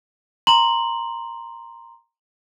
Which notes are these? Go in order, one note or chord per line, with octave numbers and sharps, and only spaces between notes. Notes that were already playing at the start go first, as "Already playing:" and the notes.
A#5 C6 F#7